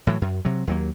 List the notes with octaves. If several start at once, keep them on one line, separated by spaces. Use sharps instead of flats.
A2 E3 F#3
F#2
C3 F#3
D#2 F#3 A#3